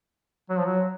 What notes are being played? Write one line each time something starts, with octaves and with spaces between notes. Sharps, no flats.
F#3
F3
F#3